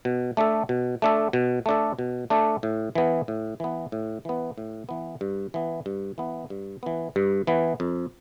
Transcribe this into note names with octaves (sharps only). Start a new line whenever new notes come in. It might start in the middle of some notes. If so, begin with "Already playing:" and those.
B2
A3 D4 A4
B2
A3 D4 A4
B2
A3 D4 A4
B2
A3 D4 A4
A2
E3 B3
A2
E3 B3
A2
E3 B3
A2
E3 B3
G2
E3 B3
G2
E3 B3
G2
E3 B3
G2
E3 B3
F2